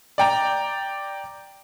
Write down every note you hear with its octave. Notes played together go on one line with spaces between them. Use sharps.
D5 G5 A#5